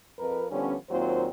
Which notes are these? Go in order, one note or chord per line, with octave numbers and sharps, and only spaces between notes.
F2 A#4 B4
D3 F3 G3 B3 C#4
D#2 A#2 F#3 C4 F4 C5